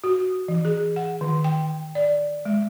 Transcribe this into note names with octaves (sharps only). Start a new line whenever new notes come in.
F#4
E3
G#4
F#5
D#3
G5
D5
G#3